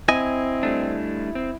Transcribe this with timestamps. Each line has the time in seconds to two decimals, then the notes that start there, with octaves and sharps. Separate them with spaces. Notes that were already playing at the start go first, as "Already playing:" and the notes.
0.09 C4 E4 D#5 G#5
0.63 G3 A3 D4
1.35 C4